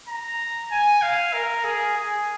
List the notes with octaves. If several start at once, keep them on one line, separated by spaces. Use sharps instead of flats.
A#5
G#5
F5
A#4
G#4
G#4